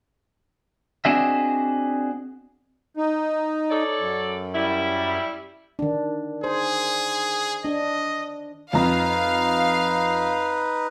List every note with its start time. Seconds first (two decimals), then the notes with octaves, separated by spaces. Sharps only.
1.05 C4 D4 F#4 G#4 D#5 E5
2.97 D#4
3.71 A4 C#5 D5
3.99 F#2
4.55 G3 E4
5.79 D#3 D4
6.44 G#4 C5
7.64 D4 D#5
8.73 F2 D#4 B4 F5 A#5